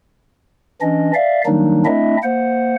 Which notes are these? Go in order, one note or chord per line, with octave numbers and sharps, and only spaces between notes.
E3 C#4 D4 D#5
D5 E5 F5
D#3 F#3 G3 A#3 D4 D#4
A3 C4 D4 E4 D#5 E5
A#3 C5 F#5